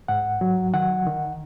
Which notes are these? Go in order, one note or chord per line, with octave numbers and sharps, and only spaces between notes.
G#2 F#5
F#3
D#3 F#5
D#3